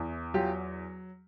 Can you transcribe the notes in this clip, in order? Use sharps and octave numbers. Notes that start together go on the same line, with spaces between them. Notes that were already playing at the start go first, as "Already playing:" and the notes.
Already playing: E2 E3
F#3 F4 G4